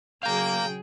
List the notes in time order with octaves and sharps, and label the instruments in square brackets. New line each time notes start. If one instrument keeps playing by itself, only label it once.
[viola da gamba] C#3 F#3 G#4 [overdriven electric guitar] F5 A#5 [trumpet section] G5